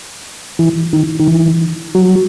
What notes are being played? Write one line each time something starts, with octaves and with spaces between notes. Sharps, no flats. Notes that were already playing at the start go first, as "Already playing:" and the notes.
E3
D#3
D#3
E3
F#3